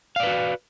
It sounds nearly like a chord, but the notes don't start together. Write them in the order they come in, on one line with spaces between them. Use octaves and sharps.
F5 D5 B4 F#4